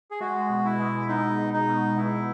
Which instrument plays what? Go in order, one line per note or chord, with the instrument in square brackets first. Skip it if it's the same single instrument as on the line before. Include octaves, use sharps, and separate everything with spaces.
[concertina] G#4
[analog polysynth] G#3 [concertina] F#4
[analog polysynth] B2
[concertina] E4
[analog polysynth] G#3
[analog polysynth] B3 [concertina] D#4
[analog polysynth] B2
[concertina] D#4
[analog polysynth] B2
[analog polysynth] B2 [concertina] E4